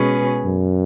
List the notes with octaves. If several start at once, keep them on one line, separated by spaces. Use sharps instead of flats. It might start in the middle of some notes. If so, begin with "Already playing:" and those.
Already playing: B2 G#3 C#4 G#4 B4
F#2